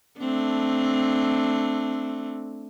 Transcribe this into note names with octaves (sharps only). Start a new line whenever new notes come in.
A3 C4 D4